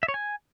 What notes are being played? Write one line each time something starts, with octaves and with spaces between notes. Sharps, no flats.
E5
C#5
G#5